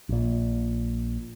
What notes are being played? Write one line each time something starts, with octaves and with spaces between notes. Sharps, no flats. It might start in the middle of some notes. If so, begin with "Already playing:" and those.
A#1 A#2